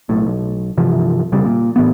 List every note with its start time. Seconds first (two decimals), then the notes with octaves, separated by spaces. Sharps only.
0.09 B1 A2
0.27 B1
0.77 G2 C3 E3 F3
1.32 F1 B1 C#3 G3
1.45 A#2
1.76 A2 E3 B3